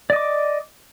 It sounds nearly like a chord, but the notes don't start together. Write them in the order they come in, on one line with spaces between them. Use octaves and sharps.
D5 D#5 D6